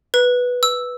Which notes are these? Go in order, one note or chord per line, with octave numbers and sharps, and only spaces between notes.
B4
E6